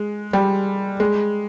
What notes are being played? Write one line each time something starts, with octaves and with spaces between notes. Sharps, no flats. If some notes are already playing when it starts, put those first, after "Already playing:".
Already playing: G#3
G3
G#3